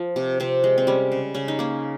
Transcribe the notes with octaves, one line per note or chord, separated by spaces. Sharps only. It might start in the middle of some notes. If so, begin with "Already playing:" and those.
Already playing: F3
C3
C3 C4
G#3
C4
G3 C#4
C#3
C#3 C#4
D#4
A#3 C#4